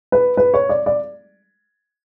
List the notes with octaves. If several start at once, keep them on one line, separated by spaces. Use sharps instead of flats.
B4
B4
C#5
D5
D5